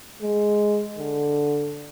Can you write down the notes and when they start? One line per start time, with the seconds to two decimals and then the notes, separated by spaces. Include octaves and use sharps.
0.22 G#3
0.98 D3